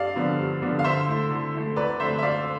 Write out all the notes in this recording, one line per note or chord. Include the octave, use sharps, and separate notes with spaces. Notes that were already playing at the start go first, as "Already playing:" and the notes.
Already playing: G2 D5 F5
D3 F3 B3 D4
G2
D3 F3 B3 D4
F5
D3 C5 E5
A3 E4
D3
A3 E4
D2 B4 D5
D3 A3 D4 C5 E5
E5
D2 D5 F5